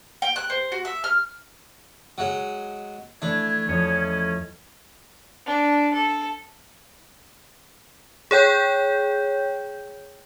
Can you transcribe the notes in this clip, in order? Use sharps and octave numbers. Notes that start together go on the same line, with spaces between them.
G5
F#6
C5
F#4
E5
F6
F#3 G#3
E3 A3 D4 G#6
E2 F3 A3 C#4 D#5
D4
A4
G#4 C#5 G5 G6